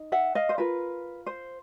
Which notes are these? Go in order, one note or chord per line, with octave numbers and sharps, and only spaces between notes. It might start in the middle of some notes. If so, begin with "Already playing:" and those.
Already playing: D#4
E5 F#5
D#5 F5
C5
F4 A#4 B4
C5